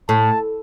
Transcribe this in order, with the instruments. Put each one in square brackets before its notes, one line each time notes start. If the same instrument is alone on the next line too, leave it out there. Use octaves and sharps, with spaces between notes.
[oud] A2 [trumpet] A5